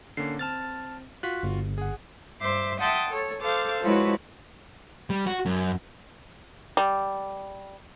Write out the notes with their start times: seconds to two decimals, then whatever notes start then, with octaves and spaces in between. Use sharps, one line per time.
0.17 D3 A#3 C#4 C7
0.39 C4 A5 F6 A6
1.23 F4 F#4 F#6 B6
1.43 G1
1.78 G#4 F#5
2.40 G2 C5 E5 D6
2.79 E5 F#5 G5 A5 C6 D#6
3.09 A4 C#5
3.41 A4 C5 F5 D6
3.82 F3 G#3 E4 F#4 B4 C#5
5.10 G3
5.26 F#4
5.46 F#2
6.77 G3